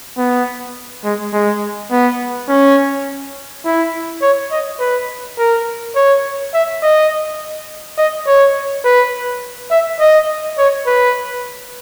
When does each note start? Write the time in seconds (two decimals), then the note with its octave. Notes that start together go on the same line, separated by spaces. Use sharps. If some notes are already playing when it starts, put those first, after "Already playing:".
0.17 B3
1.05 G#3
1.33 G#3
1.92 B3
2.49 C#4
3.65 E4
4.22 C#5
4.51 D#5
4.80 B4
5.38 A#4
5.95 C#5
6.54 E5
6.83 D#5
7.98 D#5
8.27 C#5
8.85 B4
9.70 E5
10.01 D#5
10.58 C#5
10.87 B4